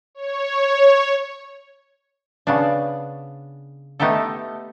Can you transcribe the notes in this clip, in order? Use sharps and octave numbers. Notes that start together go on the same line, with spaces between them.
C#5
C#3 B3 C#4 D4
A3 B3 D#4 G4 A4